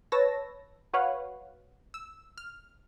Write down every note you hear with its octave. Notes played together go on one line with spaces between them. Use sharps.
B4 C#5 A5 E6 A#6
F#4 B4 C#5 F5 F#5
E6
F6